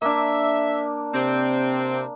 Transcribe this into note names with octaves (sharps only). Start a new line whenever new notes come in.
A#3 D4 E5
C3 C4